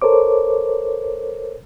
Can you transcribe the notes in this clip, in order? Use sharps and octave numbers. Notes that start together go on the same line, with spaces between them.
A4 A#4 C5 C#5 D6